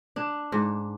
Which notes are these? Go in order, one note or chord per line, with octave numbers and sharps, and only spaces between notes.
D4
G#2